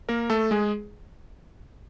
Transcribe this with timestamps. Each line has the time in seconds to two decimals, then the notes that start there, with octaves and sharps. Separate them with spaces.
0.09 A#3 A#4
0.30 A3 A4
0.51 G#3 G#4